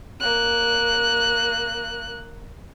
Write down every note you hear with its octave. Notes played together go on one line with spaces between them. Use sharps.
A#3 F#6